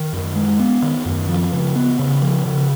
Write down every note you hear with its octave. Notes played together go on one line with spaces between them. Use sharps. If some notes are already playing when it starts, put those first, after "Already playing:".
Already playing: D#3
F#2
G#3
B3
D#3
F#2
F3
C#3
B3
C#3
F3
C#3